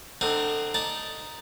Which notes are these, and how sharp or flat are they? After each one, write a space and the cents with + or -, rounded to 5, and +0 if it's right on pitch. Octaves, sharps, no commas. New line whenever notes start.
D3 +20 C4 +0 D#4 +0
D#4 +0 D5 +0 A5 +0